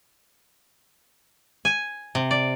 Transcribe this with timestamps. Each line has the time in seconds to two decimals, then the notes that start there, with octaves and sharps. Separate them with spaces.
1.65 G#5
2.15 C3
2.31 D5